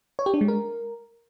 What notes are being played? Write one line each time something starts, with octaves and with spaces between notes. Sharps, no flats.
C#5
G4
D4
G#3
A#4